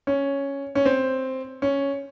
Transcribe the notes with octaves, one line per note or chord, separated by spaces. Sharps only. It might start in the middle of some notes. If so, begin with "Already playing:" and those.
C#4
C#4
C4
C#4